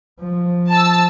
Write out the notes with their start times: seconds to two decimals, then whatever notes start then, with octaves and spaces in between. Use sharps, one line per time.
0.21 F3
0.75 A5 E6